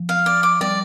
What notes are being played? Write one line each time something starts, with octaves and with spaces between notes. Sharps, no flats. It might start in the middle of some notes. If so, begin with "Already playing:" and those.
Already playing: F3
F5
D5
D6
G3 D5